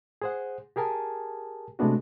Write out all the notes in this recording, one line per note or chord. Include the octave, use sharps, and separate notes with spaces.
G#4 C5 F#5
G4 G#4 A#4 G#5 A5
C3 G#3 A3 B3 D4 F#4